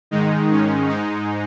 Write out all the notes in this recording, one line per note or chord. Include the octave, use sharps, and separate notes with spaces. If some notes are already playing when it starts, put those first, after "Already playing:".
G#2 D#3 G#3 D#4
C#4
G#2 G#3 D#4